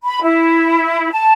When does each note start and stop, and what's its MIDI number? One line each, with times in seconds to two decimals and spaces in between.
0.04 0.22 83
0.22 1.08 64
1.11 1.33 81